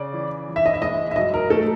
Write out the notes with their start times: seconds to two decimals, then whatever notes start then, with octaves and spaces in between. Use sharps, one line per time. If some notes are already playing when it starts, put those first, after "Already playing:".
Already playing: C#3 D5
0.13 E3
0.49 E3
0.56 E5
0.66 D#5
0.74 E5
0.82 G#3 D#5
1.11 E5
1.16 F#3 D#5
1.34 A#4
1.50 A3 A4